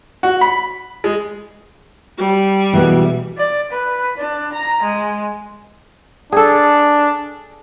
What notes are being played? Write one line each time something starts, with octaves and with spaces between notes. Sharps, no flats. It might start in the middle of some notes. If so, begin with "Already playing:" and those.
F#4
B5
G#3
G3
B2 E3 G#3 B3
D5
B4
D4
A#5
G#3
D4 G#4 A4